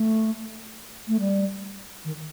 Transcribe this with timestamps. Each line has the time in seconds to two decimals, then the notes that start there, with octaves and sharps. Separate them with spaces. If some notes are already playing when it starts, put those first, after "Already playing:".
Already playing: A3
1.07 A3
1.19 G3
2.04 D#3